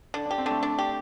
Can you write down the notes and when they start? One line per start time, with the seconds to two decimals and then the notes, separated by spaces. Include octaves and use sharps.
0.14 D3 D4
0.26 D4 G4
0.38 C4
0.46 D3 A3
0.63 D4
0.78 G4